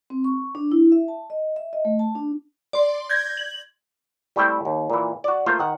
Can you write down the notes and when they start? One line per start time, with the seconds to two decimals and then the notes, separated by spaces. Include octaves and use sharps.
0.10 C4
0.24 C#6
0.55 D4
0.72 E4
0.92 E5
1.08 A5
1.30 D#5
1.56 E5
1.73 D#5
1.85 A3
1.99 A5
2.15 D4
2.73 D5 C6
3.10 G6 G#6 A#6
3.37 F#7
4.36 G3 A3 C4 E4 G5
4.65 D#2
4.90 A#2 E3
5.24 F#4 D5
5.46 A3 A#3 F4 C5
5.59 D#3 F#5